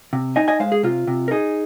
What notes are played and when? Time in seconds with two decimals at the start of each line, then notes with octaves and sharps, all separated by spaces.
0.13 C3
0.36 D#4 D#5 G#5
0.48 D#5 G#5
0.60 G#3 C5 F5
0.72 G#4
0.83 C3 F4
1.07 C3
1.28 A#4
1.31 D#4 G#4